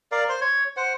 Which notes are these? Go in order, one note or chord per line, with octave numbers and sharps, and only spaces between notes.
A#4 D5 F5
C5 C6
C#5
C5 F#5